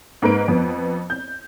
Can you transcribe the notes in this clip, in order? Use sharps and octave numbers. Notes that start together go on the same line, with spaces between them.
G#2 A#3 B4 D7
F2 B3
G6